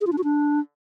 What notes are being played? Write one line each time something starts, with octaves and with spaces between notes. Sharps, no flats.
G#4
F4
D4
F#4
D4